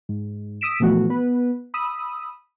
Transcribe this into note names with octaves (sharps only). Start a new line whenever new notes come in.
G#2
D#6 E6 B6 D7 E7
A#2 E3 F3 A3 B3 F#4
B3 B4
B5 D#6 E6